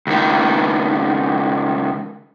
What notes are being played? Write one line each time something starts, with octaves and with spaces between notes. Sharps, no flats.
C#2 D#3